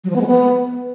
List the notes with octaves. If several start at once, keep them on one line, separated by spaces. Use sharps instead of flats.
F#3
F3
B3
G#3
B3